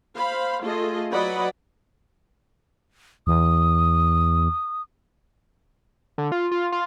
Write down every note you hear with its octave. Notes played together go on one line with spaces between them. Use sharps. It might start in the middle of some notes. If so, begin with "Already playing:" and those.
C5 F5 B5
A3 F4 G#4 A4 D#5
F#3 B4 D5 D#5 F#5 B5
E2 D#6
D3
F4
F4
F4